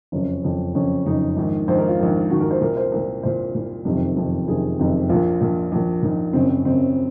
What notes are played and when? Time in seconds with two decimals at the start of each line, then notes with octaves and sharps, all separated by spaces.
0.12 F#1 F2 C#3 C#4
0.44 F#1 F2 C#3
0.74 F#1 F2 C#3 C#4
1.06 F#1 F2 C#3 D#4
1.37 A#1 G#2 D#3
1.68 A#1 G#2 D#3 C5
1.78 A#4
1.88 F4
1.99 A#1 G#2 D#3
2.30 A#1 G#2 D#3 F#4
2.40 A#4
2.51 C5
2.61 C2 A#2 A#4
2.77 C5
2.92 C2 A#2 A#4
3.23 C2 A#2 C5
3.55 C2 A#2
3.85 F#1 F2 C3 D#3
4.16 F#1 F2 C3 D#3
4.47 F#1 F2 C3 D#3 G#4
4.78 F#1 F2 C3 D#3
5.09 A#1 A#2 F4
5.41 A#1 A#2
5.72 A#1 A#2
6.03 A#1 A#2 D#4
6.33 F#1 F#2 C#3 C4
6.49 C4
6.65 F#1 F#2 C#3 C4